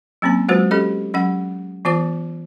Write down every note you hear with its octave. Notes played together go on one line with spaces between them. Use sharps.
F#3 A#3 C4 C#4 G#5
F#3 G#3 F4 F#4 B4 C5
C#4 G4 A4 D#5
F#3 C#4 F#5
E3 B3 F4 C5 D6